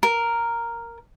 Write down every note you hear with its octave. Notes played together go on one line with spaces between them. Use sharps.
A#4